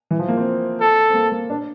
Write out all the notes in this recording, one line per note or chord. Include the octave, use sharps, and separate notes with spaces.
E3
F3
A#3
C4
A4
C4
A#3
A#3
D4